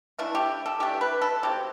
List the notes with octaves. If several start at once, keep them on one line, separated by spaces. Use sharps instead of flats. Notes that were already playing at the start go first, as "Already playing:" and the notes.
E3 A3 D4 E4
G4
A4
E3 A3 D4 G4
B4
A4
F#3 C4 G4